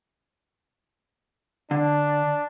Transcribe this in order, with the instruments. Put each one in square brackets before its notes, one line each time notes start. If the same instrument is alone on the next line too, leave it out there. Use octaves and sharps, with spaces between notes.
[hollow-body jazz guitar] D3 [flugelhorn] D4